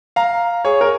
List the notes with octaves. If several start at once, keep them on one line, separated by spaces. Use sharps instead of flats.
F5 A#5
G#4 C#5
A#4